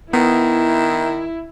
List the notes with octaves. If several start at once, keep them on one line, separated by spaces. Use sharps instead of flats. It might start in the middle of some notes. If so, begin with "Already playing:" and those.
D#3 B3 E4